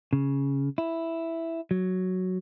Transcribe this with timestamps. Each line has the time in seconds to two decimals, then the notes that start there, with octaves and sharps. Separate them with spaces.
0.13 C#3
0.78 E4
1.71 F#3